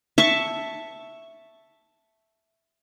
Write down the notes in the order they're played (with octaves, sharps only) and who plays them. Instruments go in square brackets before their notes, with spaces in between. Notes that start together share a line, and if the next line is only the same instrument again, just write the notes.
[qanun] E5 A5 C#6